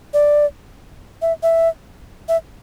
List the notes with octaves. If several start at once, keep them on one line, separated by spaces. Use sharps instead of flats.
D5
E5
E5
E5